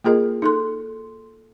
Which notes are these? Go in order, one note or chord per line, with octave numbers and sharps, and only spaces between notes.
A#3 F4 G#4 A#4 D#5
D#4 A4 C6